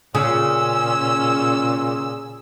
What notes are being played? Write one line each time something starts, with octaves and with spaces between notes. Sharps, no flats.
A#2 C#3 C#4 G#4 E6